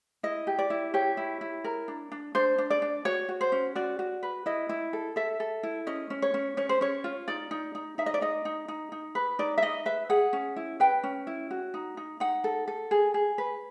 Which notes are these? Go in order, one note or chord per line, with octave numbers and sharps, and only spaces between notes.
E4 D#5
G4
D5
E4
G4 C#5
E4
E4
A#4
D4
D4
D4 C5
D4
D5
D4
F#4 C#5
F#4
C5
C#4
F#4 D5
F#4
B4
E4 D#5
E4
A4
A4 E5
A4
E4
C#4 D#5
C#4
C#5
C#4
C#4 C#5
C5
C#4 C#5
F4
D#4 D5
D#4
D#4
D#4 E5
D#5
D5
D#4 D#5
D#4
D#4
D#4
B4
D#4 D5
E5
D#4 D#5
B4 E5
G#4 F#5
C#4
E4
B4 G5
C#4
E4
F#4
D#4
D#4
D#4 F#5
A4
A4
G#4
G#4
B4